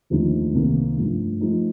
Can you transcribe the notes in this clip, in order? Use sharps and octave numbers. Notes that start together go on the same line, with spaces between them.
D#2 D3 F3 A3 D#4
C2 C3 D#3 A#3
G2 F3 A3
F3 A3 D#4